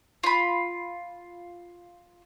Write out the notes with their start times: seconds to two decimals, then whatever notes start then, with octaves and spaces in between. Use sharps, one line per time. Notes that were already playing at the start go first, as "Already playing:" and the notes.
0.24 F4 B5